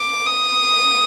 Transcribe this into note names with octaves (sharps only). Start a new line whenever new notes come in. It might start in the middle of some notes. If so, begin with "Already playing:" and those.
Already playing: D6
D#6